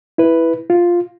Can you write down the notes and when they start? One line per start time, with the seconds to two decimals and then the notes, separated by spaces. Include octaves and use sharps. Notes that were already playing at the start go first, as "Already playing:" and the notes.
0.18 E4 B4
0.70 F4